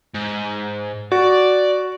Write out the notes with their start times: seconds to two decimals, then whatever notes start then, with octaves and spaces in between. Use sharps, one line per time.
0.15 G#2
1.12 F#4 D5